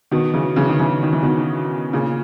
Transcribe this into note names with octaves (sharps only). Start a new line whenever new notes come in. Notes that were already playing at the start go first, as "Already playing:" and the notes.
B2 D#3
C#3 E3
C#3 E3
D#3
C#3 E3
D#3
E3
B2 D#3
A#2 C#3